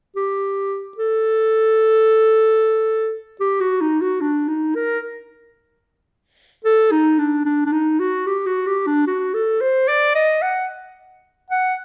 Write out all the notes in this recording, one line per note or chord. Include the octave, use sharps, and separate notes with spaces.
G4
A4
G4
F#4
D#4
F#4
D4
D#4
A#4
A4
D#4
D4
D4
D4
D#4
F#4
G4
F#4
G4
D4
F#4
A4
C5
D5
D#5
F#5
F#5